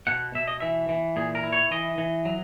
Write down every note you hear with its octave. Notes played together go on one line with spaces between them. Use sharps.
B2 F#5
B2 E5
D#5
E3 E5
E3
A#2 G#4
A#4
E4
C#5
E3 D#5
E3
F#3